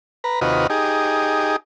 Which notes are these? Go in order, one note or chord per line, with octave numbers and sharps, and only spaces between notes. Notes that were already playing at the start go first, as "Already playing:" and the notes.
B4 A#5
D#2 C3 F4 F#4 B4 D#5
D#4 G4 G#4